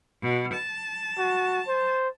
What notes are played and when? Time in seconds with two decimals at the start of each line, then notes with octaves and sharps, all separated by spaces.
0.21 B2
0.54 A5
1.18 F#4
1.67 C5